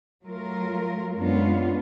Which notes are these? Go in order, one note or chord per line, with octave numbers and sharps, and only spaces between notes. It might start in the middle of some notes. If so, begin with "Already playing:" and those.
F#3 A3 F4 A#4
F#2 G#3 B3 C#4 D4 F4